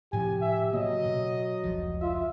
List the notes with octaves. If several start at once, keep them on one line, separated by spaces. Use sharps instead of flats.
A2 C3 F3 G4 G#5
E5
C#3 F#3 A#3 D#5
B2
F1 C#2 F3
F4 E5